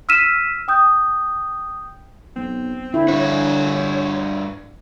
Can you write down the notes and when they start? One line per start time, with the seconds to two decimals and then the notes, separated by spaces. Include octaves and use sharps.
0.09 E6 F6 B6 D#7 E7
0.68 G5 D#6 G6
2.36 B1 C4
2.94 D3 E4
3.08 G2 F#4 C#5